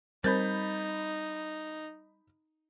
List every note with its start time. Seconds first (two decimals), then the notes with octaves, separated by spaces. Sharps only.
0.24 G3 C4 D#4 A#4 C5 B5 G6 A6